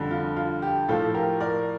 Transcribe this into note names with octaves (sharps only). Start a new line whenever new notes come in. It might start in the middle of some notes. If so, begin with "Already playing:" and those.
Already playing: F2 D3 G3
F4
F4
G4
A2 F3 F4 A4
G4 A#4
A#4 D5